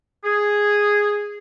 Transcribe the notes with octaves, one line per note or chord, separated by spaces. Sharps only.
G#4